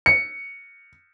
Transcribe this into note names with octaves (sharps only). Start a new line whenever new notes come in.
C#7